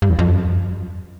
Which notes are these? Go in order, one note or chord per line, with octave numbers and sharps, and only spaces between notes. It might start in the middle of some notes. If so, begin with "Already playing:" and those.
G2
E2
F2
F#2